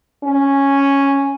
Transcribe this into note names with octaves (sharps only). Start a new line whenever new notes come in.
C#4